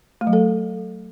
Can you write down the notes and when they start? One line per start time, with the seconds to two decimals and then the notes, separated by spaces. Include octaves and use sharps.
0.21 A3
0.27 F#3
0.33 A4